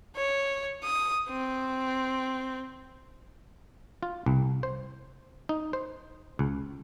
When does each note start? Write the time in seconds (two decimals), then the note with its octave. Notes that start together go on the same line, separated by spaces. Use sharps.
0.16 C#5
0.83 D#6
1.29 C4
4.03 F4
4.26 C2
4.63 C5
5.49 D#4
5.73 C5
6.39 C#2